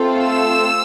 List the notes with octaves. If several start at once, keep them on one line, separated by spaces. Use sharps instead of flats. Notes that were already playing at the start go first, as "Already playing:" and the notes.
Already playing: A3 C4 F4 A4
E6